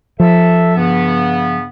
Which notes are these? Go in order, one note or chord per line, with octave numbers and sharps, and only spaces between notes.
F3 A4 E5
G2 C#3 B3